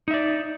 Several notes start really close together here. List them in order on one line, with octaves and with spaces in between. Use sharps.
D#4 E5 D5